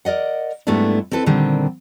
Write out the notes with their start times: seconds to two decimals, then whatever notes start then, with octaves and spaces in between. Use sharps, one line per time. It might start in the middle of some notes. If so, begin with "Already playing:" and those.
0.05 A#4 D5 D#5 F#5
0.67 G#2 G3 A3 B3 D4 E4
1.12 C4 E4 A4 B4
1.26 A#2 D3 D#3 G3 C4